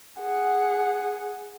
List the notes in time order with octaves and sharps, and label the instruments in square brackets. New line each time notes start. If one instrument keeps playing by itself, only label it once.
[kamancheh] G#4 F#5